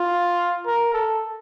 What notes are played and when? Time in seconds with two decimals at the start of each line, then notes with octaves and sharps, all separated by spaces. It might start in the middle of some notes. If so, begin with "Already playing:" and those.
Already playing: F4
0.66 A#4
0.94 A4